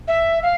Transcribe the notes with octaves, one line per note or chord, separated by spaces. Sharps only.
E5
F5